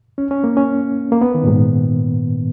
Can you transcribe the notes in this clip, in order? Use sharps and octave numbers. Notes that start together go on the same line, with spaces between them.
C#4
C#4
A#3
C#4
A#3
B3
D#3
A#2
G#2